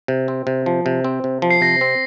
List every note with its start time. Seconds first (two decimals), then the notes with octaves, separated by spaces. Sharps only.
0.08 C3
0.28 C4
0.47 C3
0.66 F3
0.86 C3
1.04 C4
1.24 C3
1.42 F3
1.50 C7
1.61 C3 A#6
1.81 C4